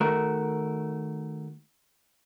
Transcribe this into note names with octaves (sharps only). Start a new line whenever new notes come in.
D#3 A3 F#4 A#4